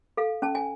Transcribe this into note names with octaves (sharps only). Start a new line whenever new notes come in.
A4 F5
C#4 A5
G#5